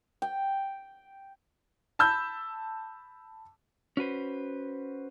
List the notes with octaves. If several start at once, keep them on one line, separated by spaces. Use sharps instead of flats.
G5
A5 B5 E6 G6
C#4 F#4 B4 C5